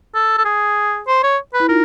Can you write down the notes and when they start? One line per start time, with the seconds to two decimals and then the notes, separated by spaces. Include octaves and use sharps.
0.15 A4
0.38 A4
0.45 G#4
1.08 C5
1.24 C#5
1.54 B4
1.60 E4
1.69 D#4 F4 A#4